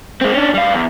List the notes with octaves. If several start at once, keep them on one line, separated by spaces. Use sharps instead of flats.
G#3 C4
C#4 D4
G3 F5
E2